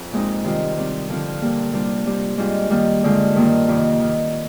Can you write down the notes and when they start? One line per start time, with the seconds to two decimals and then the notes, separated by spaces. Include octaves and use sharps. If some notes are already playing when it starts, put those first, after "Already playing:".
Already playing: F2
0.12 A#2 G#3 C4 D#4
0.45 C3 D#3 G3 C4 F4
0.77 C3 G3 C4
1.09 D3 F3 C4 F4
1.41 A#2 G3 A#3
1.73 C3 G3 D4 F4
2.06 C3 G3 C4
2.38 G#2 G3 D4 F4
2.70 D#3 G3 A#3
3.03 G2 D3 G#3 C4 F4
3.35 G2 D#3 G3 A#3 F4
3.68 F2 C3 D#3
4.01 D#3